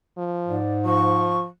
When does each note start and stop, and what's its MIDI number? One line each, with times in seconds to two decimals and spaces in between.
0.18 0.59 53
0.48 1.46 44
0.48 0.74 74
0.85 1.47 53
0.85 1.40 85